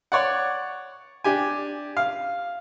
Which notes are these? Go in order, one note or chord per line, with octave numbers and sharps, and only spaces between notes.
C#5 D5 F#5
D4 G4 G#5
F5